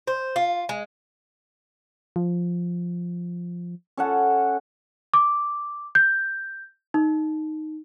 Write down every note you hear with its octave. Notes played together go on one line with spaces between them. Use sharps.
C5
F4
G#3
F3
C#4 A4 F#5
D6
G6
D#4